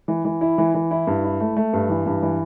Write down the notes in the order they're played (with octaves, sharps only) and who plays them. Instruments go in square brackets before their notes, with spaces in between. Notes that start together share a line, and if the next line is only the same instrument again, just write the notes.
[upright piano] E3
E3
E4
E3
E3
E4
G2
E4
A3
A3
G2
E3
G2
E3